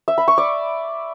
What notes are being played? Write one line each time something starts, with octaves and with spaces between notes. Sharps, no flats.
E5
B5
C#6
D5